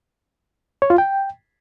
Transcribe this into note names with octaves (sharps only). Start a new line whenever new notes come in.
C#5
F4
G5